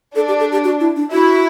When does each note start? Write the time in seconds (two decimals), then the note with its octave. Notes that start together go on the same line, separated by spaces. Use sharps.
0.16 D4 A4
0.28 G4
0.40 A4
0.52 G4
0.64 F#4
0.80 E4
0.96 D4
1.12 E4 F#4